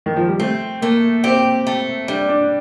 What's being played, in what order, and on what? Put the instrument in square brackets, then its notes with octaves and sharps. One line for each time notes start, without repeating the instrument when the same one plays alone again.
[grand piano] D#3
F3
G3
[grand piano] A3 [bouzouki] C4
[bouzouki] A3 [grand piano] A#3
[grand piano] C4 [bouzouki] G4
[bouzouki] A3
[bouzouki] G3 [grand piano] D4
[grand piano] D4